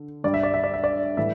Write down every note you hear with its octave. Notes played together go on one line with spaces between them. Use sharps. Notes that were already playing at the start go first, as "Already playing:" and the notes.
Already playing: D3
G2 G3 D5
E5
D5
E5
D5
E5
D5
A2 E3 G3 E5